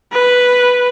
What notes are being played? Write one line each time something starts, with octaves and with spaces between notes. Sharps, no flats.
B4